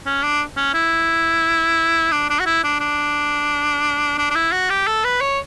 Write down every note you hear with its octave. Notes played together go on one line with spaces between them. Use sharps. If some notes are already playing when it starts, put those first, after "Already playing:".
C#4
D4
C#4
E4
D4
D4
F#4
E4
D4
D4
D4
D4
E4
F#4
G4
A4
B4
C#5